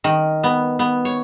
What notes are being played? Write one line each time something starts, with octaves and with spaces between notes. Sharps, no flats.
D#3
B3
B3
C#5